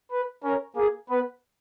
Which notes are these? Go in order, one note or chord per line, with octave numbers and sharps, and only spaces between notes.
B4
C#4 A#4
A#3 G#4
B3 B4